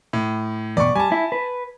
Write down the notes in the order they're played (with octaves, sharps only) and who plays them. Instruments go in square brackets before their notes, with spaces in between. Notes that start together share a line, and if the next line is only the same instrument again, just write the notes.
[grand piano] A2
[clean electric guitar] E2 G2 B2 [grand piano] D5 C#6
[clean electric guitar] G3 [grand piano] G#5 A5
[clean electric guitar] E4
B4